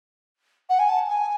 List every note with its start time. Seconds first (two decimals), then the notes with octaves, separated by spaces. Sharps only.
0.69 F#5
0.79 G#5
0.89 A5
1.09 G#5